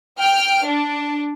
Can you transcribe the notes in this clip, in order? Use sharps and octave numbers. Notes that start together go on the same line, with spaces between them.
G5 F6
D4